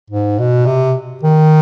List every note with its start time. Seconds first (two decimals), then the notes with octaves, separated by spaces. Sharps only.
0.10 G#2
0.39 B2
0.66 C3
1.23 D#3